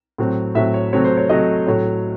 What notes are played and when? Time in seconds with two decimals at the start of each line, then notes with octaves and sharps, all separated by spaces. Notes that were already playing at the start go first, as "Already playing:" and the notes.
0.18 A2 F#3 C4
0.55 A2 F#3 C4 E5
0.74 C#5
0.93 C3 F#3 A3 C4 C#5
1.04 C5
1.17 C#5
1.29 C3 F#3 A3 C4 D#5
1.66 A2 F#3 A3 C#5